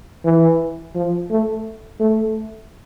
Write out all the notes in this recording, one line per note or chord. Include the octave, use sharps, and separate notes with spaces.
E3
F3
A3
A3